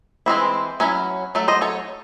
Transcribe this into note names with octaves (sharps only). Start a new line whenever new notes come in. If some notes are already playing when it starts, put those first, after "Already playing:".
E3 G#3 C4 E4
F#3 C#4 E4
F#3 A3
C5 D#5
A4 C#5